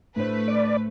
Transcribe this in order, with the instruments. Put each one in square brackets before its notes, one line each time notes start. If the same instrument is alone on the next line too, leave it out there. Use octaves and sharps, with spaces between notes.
[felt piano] A2 D4 C5 [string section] A3 B4
[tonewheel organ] D5